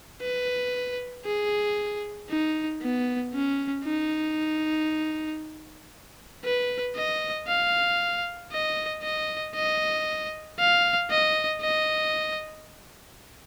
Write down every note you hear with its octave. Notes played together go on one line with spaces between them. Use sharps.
B4
G#4
D#4
B3
C#4
D#4
B4
D#5
F5
D#5
D#5
D#5
F5
D#5
D#5